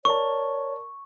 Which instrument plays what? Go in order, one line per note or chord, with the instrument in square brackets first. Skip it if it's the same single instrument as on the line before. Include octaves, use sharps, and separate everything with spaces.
[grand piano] A#4 D5 A5 [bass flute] C#5 [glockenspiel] C#6